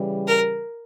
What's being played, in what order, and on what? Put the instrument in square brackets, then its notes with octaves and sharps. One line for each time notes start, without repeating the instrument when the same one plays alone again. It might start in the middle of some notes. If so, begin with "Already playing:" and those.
Already playing: [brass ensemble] C#3 E3 G3
[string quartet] A#4